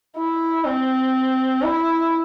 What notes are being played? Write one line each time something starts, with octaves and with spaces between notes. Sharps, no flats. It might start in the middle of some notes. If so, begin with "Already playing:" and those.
E4
C4
E4